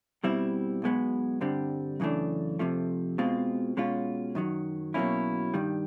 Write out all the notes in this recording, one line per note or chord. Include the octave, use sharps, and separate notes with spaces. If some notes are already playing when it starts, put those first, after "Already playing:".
B2 G3 C4 E4
B1 B2 G#3 B3
G2 D3 G3 C4
F#2 C#3 E3 A3 D4
F2 C3 F3 A3
B2 G#3 C4 F4
B2 G#3 C#4 F4
F#2 D#3 F#3
B2 F#3 A#3 C#4 E4
G2 D#3 G3